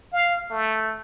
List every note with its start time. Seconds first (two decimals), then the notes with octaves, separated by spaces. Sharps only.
0.13 F5
0.51 A3